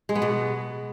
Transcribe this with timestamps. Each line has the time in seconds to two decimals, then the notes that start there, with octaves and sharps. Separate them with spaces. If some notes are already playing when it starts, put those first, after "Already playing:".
0.09 G#3
0.15 B3
0.22 B2